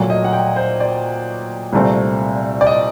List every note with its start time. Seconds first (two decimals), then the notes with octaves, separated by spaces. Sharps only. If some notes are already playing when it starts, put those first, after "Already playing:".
Already playing: A#2 F#3 A3
0.10 D#5
0.24 F#5
0.33 G5
0.56 C5
0.80 D5
1.73 C2 A#2 A3 C4
2.61 D5
2.66 D#5